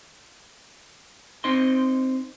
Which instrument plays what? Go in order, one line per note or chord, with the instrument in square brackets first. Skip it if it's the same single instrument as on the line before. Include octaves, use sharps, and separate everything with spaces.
[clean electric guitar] C4 D#4 C5 D#5 C6